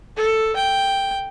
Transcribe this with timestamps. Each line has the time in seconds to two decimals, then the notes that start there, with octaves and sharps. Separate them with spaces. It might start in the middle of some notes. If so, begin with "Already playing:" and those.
0.17 A4
0.56 G5